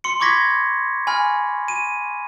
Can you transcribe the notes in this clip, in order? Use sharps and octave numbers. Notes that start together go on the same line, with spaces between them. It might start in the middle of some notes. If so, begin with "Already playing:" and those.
C6 C#7
B5 C#6 D6 G#6 A#6 B6
G#5 B5 F6
D#7